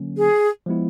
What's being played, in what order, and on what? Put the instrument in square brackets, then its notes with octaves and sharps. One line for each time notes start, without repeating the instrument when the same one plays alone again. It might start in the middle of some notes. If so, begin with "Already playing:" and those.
Already playing: [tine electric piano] D3 F#3 A#3 C#4
[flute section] G#4
[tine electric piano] F3 G#3 B3 E4